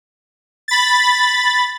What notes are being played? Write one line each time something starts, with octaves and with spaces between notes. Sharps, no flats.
B5 A6